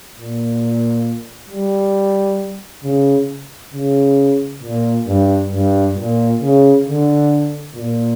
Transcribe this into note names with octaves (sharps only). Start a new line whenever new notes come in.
A#2
G3
C#3
C#3
A#2
G2
G2
A#2
C#3
D3
A#2